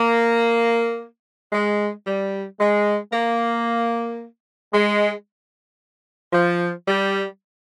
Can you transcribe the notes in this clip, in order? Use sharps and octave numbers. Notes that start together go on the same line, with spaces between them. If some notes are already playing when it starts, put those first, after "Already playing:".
Already playing: A#3
G#3
G3
G#3
A#3
G#3
F3
G3